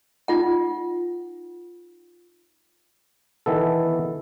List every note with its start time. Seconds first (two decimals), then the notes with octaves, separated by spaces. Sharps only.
0.28 D#4 F4 F#5
3.46 D#3 E3 B3 A4